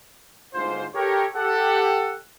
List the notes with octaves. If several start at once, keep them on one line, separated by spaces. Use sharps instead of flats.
G1 D2 G#2 F4 C5
G4 A4 A#4 C#5
G4 A4 F#5